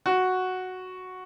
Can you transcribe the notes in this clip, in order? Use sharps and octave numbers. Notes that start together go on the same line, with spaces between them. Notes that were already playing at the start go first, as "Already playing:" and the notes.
F#4